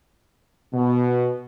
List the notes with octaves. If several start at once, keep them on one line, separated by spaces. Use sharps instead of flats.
B2